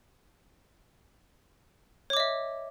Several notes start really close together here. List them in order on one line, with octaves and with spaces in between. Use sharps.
C#5 D6 D#5 E5